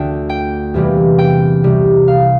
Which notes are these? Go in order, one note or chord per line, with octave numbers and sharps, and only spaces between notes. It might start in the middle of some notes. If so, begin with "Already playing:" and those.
Already playing: D2 D3 A3 D4 G5
G5
E2 C3 E3 G3 A#3
G5
C2 C3 G3
F5